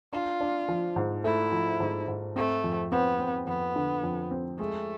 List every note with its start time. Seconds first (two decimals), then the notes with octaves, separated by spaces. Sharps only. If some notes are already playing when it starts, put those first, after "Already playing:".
0.13 D4 F4
0.41 D4
0.69 F3
0.96 G#2
1.24 A3 E4
1.52 F3
1.80 G#2
2.08 G#2
2.36 A3 C4
2.64 F2
2.91 B3 C4
3.19 C4
3.47 F2 B3
3.76 D3
4.03 F2
4.31 C4
4.59 G#3 A3